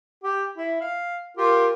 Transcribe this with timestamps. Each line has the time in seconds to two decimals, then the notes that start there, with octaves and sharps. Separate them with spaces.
0.23 G4
0.57 E4
0.81 F5
1.37 F4 G4 A#4